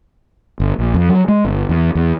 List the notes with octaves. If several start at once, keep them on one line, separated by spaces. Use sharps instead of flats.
G1
A#1
F2
F#3
G#3
G1
E2
E2